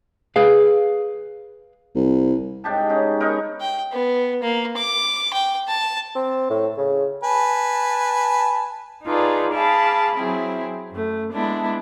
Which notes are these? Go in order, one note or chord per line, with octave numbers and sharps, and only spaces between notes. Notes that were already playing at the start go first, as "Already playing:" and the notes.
G#4 B4 F5
C2
G#2 D4 G4 A5
C#4 D#4
B3 D#4 A#4
G5
B3
A#3
D6
G5
A5
C4
A2
C#3
B4 G#5 A5
D#4 F4 G#4 A4 B4 D5
G#4 F5 A5 B5 D6
F#3 C4 E4 G#4
F#2 A3
G#3 B3 D4 E4